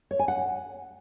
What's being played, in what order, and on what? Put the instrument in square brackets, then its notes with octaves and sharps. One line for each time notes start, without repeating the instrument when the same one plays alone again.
[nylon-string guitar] C#5
G#5
F#5